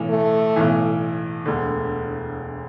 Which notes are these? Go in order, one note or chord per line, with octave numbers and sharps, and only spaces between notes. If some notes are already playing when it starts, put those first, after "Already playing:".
Already playing: B1 A2 E3
A3
B1 A2 E3
E1 D2 D3